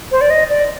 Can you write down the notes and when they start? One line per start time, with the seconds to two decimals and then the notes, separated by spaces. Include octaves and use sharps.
0.12 C5
0.21 D5
0.30 D#5
0.50 D5